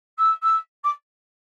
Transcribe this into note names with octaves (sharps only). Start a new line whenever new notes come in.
E6
E6
D6